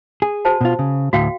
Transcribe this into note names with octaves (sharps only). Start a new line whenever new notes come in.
G#4
F#4 C5 A5
B2 F4
C#3
D2 A2 F#4 F5 G5